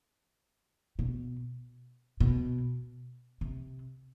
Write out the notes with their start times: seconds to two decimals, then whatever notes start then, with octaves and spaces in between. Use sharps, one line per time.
0.99 B2
2.20 B2
3.41 C3